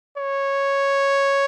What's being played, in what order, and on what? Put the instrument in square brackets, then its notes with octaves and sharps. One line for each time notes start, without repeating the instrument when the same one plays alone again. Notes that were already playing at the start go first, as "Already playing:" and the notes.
[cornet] C#5